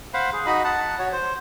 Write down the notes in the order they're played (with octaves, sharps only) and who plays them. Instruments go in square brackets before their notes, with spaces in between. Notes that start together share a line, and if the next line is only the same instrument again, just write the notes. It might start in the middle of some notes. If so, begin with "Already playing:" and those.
[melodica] C5 F5 F#5 B5
G#4
D#4 F#4 D#5 B5
F#5 A5
F#4 C#5
C5